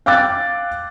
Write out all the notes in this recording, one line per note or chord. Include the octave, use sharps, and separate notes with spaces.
F5 G5 D6 E6 F#6 A6